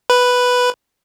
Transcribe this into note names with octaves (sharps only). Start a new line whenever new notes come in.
B4